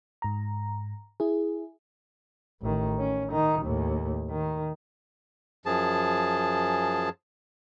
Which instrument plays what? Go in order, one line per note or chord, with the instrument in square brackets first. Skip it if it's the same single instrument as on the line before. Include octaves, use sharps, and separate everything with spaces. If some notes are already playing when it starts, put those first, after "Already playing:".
[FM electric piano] G#2 A#5
E4 G#4
[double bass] A1 D#3
C#4
D#3 D#4
D#2 A2
D#3
[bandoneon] F#2 F3 G#4 A5